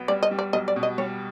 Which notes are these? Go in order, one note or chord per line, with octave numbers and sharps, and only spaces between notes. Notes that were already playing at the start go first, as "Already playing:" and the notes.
Already playing: B1 B3
G3 D5
D#5
G3
D5
B1 D#5
D5
B2
D#5
G3 C#5